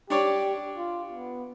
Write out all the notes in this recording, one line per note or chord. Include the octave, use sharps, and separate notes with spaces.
D4 G4 C#5 D5
F4
B3